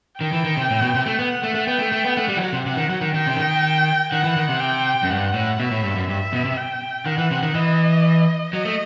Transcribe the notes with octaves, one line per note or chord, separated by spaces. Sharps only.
D#3 G5
E3
D#3
C3
A2
B2
C3
A3
B3 F#5
A3
A3
B3 G5
A3
A3
B3
A3 F#5
G3
E3
F#3
C3
C3 F#5
D#3
F#3
D#3
D#3 G5
C3
D#3
D#3 F#5
E3
D#3
C3
G5
F#2
G2 F#5
A2
B2 E5
A2
G2
F#2
G2 E5
B2
C3
G5
D#3 F#5
E3
C3
D#3
E3 D#5
F#3 D#5
A3